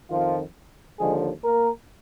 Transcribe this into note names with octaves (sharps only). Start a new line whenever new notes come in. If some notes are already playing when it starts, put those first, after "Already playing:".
F2 D#3 F3 F4
D#2 D3 F3 G#3 G#4
A#3 A#4